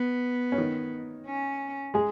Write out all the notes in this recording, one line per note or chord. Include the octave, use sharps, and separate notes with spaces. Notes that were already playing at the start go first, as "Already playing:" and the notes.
Already playing: B3
C#4
D#3 D#4
C#4
G#3 G#4